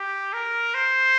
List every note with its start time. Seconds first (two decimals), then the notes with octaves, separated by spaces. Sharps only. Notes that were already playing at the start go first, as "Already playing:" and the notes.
Already playing: G4
0.33 A#4
0.74 C5